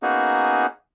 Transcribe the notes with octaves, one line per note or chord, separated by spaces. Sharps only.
A#3 B3 C#4 D#4 F#4 G#4